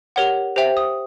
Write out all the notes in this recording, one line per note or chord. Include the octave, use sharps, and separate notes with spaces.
G4 A#4 C#5 F#5
G4 C5 E5 G5
D#6